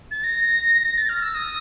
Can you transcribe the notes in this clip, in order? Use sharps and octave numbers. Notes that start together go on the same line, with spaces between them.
A6
A#6
A6
F6
E6
D#6